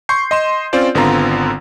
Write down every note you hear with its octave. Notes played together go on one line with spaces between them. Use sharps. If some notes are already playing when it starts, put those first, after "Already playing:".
C6 C#6 G6 C7
D#5 C6 E7
C4 C#4 F4 C5 D5
G#1 D3 B3 C4 F4 A#5